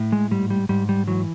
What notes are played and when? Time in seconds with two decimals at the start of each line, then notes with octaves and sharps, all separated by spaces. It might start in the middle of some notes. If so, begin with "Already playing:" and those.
Already playing: A2
0.12 G#3
0.31 G#2 G3
0.50 G3
0.69 G#2 G3
0.89 G3
1.07 E3 F#3